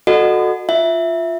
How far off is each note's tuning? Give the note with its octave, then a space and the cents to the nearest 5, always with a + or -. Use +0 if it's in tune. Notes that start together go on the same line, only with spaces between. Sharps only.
F#4 -15 A4 +0 D#5 -30
F4 +0 E5 +0